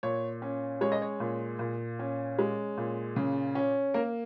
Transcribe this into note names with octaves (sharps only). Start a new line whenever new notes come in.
A#2 C#5
C#4
G#3 C#5
D#5
C#5
A#2
A#2
C#4
G#3
A#2
C#3
C#4
A#3 A#4